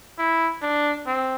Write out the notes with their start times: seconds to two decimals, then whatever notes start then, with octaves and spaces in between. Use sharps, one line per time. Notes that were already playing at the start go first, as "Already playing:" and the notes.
0.18 E4
0.63 D4
1.07 C4